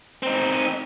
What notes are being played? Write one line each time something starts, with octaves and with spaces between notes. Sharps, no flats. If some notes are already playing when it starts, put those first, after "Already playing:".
C4 D#4